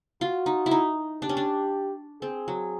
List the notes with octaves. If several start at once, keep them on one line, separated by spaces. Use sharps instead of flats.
F4 F#4
D#4
E4
D#4
D4 G4
C#4
D4
C4 G#4
F#3